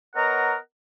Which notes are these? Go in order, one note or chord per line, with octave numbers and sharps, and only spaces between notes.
B3 A#4 C#5 D#5 F#5 A#5